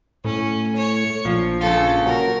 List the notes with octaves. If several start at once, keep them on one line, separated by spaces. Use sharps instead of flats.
A2 C#4
C#5
A#1 F3
C#3 F4 A4
F#3 A#4